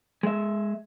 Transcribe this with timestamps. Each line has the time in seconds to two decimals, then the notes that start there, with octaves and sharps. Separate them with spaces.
0.23 G#3 E5